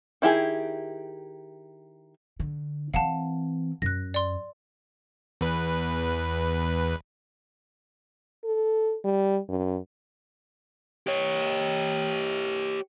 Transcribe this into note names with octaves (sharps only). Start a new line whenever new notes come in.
D#3 E4 G4 G#4
D3
E3 C4 F5 F#5 A5
F#2 F#6 A#6
D5 C6
E2 B4
A4
G3
F#2
G4 C#5